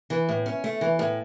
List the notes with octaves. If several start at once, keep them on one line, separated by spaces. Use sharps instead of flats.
E3
A2
C#4
A3
E3
A2